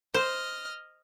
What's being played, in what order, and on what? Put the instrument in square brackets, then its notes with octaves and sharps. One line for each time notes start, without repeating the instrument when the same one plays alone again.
[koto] C5 [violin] D#5 F6